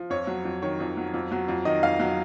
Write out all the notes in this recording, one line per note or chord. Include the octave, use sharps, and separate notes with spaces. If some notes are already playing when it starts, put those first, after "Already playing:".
Already playing: F3
F2 C#5
F#3
F2
D#3 C#5
F2
F#3
F2
F#3
F2
D#3 D#5
F2 F5
F#3